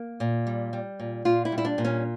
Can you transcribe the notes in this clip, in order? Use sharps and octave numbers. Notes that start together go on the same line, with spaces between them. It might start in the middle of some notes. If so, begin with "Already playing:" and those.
Already playing: A#3
A#2
G3
G3
A#2
A#2 F4
E4
G3
E4
D4
A#2
C#4